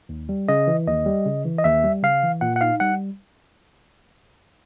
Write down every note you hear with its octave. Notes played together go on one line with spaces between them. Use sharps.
D#2
G3
C#3 D#5
E3
D#2 D#5
G3
C#3
E3
D#5
D#2 E5
G3
C#3 F5
E3
A#2 F#5
F#5
D#4 F5
G3 F#5